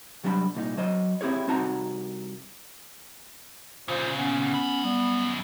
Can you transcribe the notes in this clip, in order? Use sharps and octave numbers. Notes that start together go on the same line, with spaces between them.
C2 F#3 G3 D4 F#5 B5
C2 A#2 D#4
F#3 C5 D#5
C4 E4 G4 G#4 C#5
C2 C4 D#4 F#4 A5 A#5
A#2 C#3 F4 C5
B3 C#4
F#2 B5
G3 B3